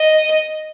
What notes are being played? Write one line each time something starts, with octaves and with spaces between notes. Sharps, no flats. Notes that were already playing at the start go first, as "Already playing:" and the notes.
Already playing: D#5